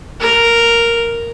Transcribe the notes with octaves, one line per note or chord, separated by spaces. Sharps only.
A#4